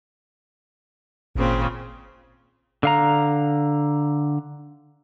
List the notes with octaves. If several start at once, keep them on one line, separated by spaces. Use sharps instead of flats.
G#1 A#2 C#3 C4
D3 F5 A#5